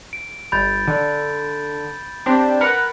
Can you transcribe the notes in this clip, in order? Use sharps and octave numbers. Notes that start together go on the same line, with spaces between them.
D7
G1 B5 G6 A6
D3
C4 D4 G4
A#4 B4 F#5